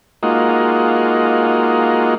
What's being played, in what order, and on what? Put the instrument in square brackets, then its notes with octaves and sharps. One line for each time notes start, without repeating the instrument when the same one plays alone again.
[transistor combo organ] G#3 A#3 D#4 F4 F#4